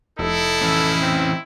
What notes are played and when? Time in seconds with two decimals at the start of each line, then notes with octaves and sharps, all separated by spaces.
0.19 F1 D#4 E4 A4
0.62 E3 C#4
1.02 C4